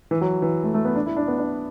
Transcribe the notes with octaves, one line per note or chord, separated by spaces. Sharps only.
E3
F#3
E3
A3
A3
B3
D4
E4
D4
B3
D4